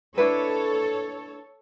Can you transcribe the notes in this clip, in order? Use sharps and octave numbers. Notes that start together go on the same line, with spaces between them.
D4 E4 A4 B4 C#5